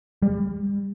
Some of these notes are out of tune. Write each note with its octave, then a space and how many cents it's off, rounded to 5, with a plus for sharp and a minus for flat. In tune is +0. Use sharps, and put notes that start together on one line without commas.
G3 +30